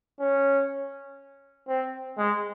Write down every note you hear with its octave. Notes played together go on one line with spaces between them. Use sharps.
C#4
C4
G#3